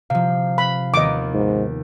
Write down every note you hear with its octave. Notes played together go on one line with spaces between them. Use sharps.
C3 F3 F5
B5
D#2 B3 D#5 D6
G#2